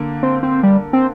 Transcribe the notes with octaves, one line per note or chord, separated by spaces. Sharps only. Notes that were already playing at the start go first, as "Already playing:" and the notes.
Already playing: D3 A#3
C4
C4
G3
C4